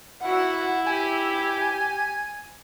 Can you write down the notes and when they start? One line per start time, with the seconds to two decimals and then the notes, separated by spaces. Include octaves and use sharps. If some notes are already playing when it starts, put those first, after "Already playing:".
0.22 E4 F#4 F#5
0.87 G4 G#5